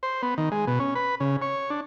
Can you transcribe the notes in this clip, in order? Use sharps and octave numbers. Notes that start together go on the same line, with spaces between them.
C5
B3
D#3
G#3
B2
C#4
B4
C#3
C#5
D4